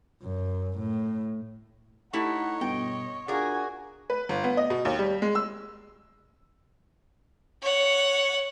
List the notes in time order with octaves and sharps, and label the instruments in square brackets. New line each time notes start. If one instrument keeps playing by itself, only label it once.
[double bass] F#2
A2
[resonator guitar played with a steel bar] A3 E4 [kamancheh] D#4 F#5 [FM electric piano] G4 [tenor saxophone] C#5
[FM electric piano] G2 B2 [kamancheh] D#5 [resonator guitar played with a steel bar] G5
[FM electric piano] D4 F4 D5 [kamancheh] F#4 G#5 [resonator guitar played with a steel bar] G#4 A#4
[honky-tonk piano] B4
G1
B3
D#5
B2
D#2
G3
G#3
E6
[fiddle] C#5 F#5